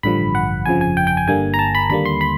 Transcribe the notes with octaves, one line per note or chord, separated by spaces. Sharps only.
A1 G2 D3 F3 B5
F#5
G1 F2 C#3 F3 G#5
G#5
G5
G5
G#5
G1 G2 D3 G3 A#3 G#5
A#5
A5
B5
D#2 D3 G3 A#3 B5
C6
B5